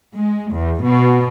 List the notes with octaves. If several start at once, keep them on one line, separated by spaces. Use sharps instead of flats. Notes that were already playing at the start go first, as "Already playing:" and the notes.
G#3
E2
B2